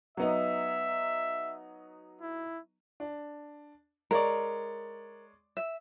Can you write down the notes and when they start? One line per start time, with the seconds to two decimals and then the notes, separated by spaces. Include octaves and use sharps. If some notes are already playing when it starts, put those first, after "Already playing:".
0.17 F#3 B3 D#4 E5
2.21 E4
3.00 D4
4.11 G#3 A#4 C#5 D5
5.57 E5